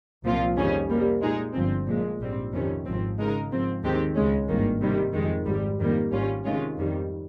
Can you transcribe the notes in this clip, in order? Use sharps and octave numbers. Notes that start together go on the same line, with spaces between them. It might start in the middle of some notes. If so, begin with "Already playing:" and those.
C2 A#2 F3 C4 F4
F2 D#3 G3 C#4 G#4
C3 G3 A#3
A#2 G#3 D#4 G#4
G1 G2 F3 C4
A#2 F3 G#3
A#1 G#2 G3 C4
F2 C3 D#3 G3 C#4
G#1 G#2 F3 C4
C#3 G#3 D#4 A#4
G#2 F3 C4
D#2 D#3 G#3 C4 G4
C#2 C#3 G#3 C#4
G#1 G2 D#3 A#3
C3 D#3 G3
F2 D#3 G#3
G#1 G#2 G3
F2 D#3 G3 A#3
G#1 G#2 G3 C#4 F4
C3 D#3 G#3 C#4 F4
F2 D#3 G3